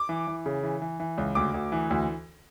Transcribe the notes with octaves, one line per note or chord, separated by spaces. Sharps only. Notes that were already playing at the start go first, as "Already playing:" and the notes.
Already playing: D6
E3
E3
C#3
E3
E3
E3
C#2
D2 D6
D2
E3
D2